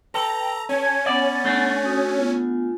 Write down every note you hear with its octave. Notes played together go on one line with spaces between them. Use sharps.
A4 B4 G5 A#5
C#4 G#6
B3 D5 F#5 A6
A3 D4
F#4 D#6
B3 F4 G#5